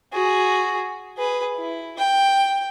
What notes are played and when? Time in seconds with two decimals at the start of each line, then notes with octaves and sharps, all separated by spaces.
0.13 F#4 G#4
1.17 G#4 B4
1.57 E4
1.99 G5